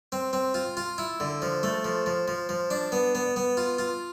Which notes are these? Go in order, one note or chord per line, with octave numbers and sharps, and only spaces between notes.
C4
C4
F4
F4
E4
D3
F3
A3
F3
F3
F3
F3
D4
B3
B3
B3
F4
F4